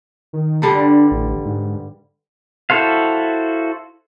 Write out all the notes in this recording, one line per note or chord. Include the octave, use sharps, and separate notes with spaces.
D#3
G2 D3 G3
D4
A1
G#2
E4 F#4 A4 C5 F5